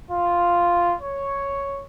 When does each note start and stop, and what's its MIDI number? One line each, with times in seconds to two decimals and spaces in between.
0.10 0.94 65
1.01 1.83 73